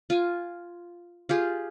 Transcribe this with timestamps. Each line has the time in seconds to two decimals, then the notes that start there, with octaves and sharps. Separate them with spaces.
0.10 F4 G#5
1.29 F4 G4 G#4